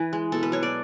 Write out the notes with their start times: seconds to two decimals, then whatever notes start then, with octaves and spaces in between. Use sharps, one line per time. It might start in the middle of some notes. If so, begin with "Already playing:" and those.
Already playing: E3 B4
0.13 G#3
0.32 B2 A4
0.43 B4
0.52 F#3 C#5
0.63 D5